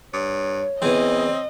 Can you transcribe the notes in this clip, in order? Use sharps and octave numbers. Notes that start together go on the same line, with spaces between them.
G2 C#5
E2 E3 C4 D#5